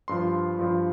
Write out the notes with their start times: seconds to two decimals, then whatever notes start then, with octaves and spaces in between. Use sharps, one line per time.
0.08 G2 F3 C6
0.59 G2 F3